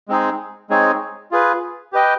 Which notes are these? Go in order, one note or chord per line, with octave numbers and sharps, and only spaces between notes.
G#3 C4 D#4 G#4
G#3 C4 D#4 G#4 C#5
F4 G#4 B4
G4 B4 D#5 G5